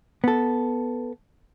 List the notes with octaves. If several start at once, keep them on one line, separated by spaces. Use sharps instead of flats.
B3 A4